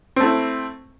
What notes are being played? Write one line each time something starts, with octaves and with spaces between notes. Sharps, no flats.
A3 C4 E4